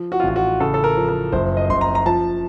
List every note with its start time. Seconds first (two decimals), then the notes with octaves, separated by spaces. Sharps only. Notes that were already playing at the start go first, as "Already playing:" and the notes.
Already playing: F3
0.12 F#4
0.20 F4
0.24 A1 F#4
0.36 F#4
0.60 C#3 A4
0.74 A4
0.84 A#4
0.97 F3
1.09 A#4
1.32 F#1 C5
1.57 D#5
1.69 F#1 C6
1.81 A#5
1.95 A#5
2.06 F3 A5